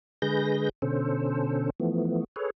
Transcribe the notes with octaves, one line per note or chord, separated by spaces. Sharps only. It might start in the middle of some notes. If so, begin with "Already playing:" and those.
D3 G#3 G#4 B4 G6 A#6
B2 D3 C#4 A4 C5
E3 F3 A3 B3
G#4 A4 B4 C#5